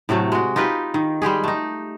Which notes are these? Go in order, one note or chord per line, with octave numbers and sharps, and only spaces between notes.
A2 C3 F#3 A3
G#3 F#4
D#4 F4 G4 B4
D#3
G3 G#3 G4 G#4
A3 D#4